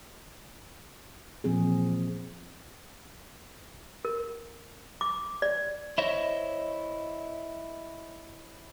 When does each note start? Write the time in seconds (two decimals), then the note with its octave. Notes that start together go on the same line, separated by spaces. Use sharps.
1.44 A#2 E3 F3 C4 G#4
4.05 A#4
5.01 D6
5.42 D5
5.98 E4 C5 C#5 D#5